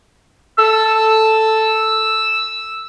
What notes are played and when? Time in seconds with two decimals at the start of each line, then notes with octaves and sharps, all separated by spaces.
0.59 A4 E6